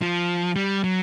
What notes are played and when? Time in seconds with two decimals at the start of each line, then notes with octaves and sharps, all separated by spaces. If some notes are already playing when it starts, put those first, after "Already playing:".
0.02 F3
0.56 G3
0.84 F#3